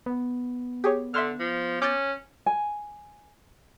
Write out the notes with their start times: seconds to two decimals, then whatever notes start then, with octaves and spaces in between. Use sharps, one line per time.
0.06 B3
0.84 G4 G#4 C#5
1.14 D3 E5 C6 F6
1.40 F3
1.82 C#4 D6 G6 A6
2.46 G#5